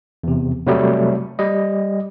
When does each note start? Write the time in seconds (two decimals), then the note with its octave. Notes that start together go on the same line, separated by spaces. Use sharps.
0.23 E2 C3
0.66 C3 F#3 G3 A3
1.39 G3 D#5